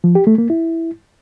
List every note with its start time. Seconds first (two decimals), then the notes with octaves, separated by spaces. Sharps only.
0.04 F3
0.15 G4
0.27 A3
0.38 A#3
0.50 E4